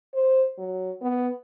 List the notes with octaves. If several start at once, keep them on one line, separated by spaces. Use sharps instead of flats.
C5
F#3
B3